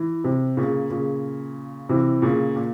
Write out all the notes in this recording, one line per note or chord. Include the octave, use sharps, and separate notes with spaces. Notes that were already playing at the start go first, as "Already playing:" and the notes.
Already playing: E3
C3
A#2 C#3
A#2 C#3
C3 E3
A#2 C#3
A#2